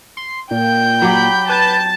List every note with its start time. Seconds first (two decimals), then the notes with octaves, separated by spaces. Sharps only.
0.17 C6
0.51 A#2 G5 G6
1.02 F#3 G4 B5
1.49 B4 A5